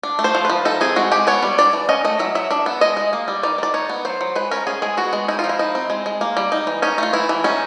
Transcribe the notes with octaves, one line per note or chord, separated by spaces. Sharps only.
D4
A3
C5
F3
F3 B4
D#4 A4
C4 G#4
G#3 F#4
G#3 G4
B3 C#5
G3
D4 D5
E3
C#4 D#5
A3 D#5
F#3 E5
F#3 E5
D4 E5
B3
G#3 D#5
G#3
A#3
G3
D#3 D5
D#3 D5
D#4 C#5
B3
F#3 C5
F#3
G#3 B4
C#4 A#4
C#4 G#4
G#3 G#4
B3 F#4
G#3
D#4 E4
F4
F3
E4
D#4
C4
G#3
G#3
A#3
G3
D#4
E3
C#4 D#4
A3 F4
E3 E4
E3
C#4 D#4